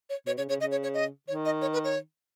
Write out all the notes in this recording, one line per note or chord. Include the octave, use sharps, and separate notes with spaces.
C#5
B2 C#5
C#3 C#5
C#3 C#5
C#3 D#5
C#5
C#5
D#5
D#3 C#5
D#5
C#5
B4
C#5